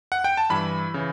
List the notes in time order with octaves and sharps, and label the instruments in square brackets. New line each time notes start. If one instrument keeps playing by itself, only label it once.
[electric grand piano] F#5
G5
A5
G2 E3 B5
C#3 E3